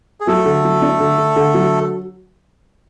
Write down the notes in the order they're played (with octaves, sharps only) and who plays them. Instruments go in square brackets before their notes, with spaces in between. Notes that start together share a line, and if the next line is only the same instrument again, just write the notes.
[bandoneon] G#4
[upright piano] F#3 [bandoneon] A3 A4
[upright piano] D3
F#3
D4
D3
D3
D3
F#3